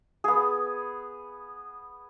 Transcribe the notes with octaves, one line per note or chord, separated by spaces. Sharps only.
B3 G#4